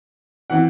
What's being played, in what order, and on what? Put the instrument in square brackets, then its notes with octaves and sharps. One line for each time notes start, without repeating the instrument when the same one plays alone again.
[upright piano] E3 C4 F#5